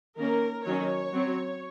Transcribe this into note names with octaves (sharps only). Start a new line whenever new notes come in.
D#3 A#3 C#4 A#4
D#3 F#3 C#4 C#5
F#3 C4